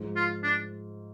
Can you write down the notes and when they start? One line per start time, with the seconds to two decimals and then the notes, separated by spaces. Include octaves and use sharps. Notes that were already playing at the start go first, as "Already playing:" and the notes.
Already playing: G#2 F3 G#3
0.16 F4
0.43 D4